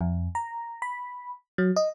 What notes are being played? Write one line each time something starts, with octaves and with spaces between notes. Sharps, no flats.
F2
A#5
B5
F#3
D#5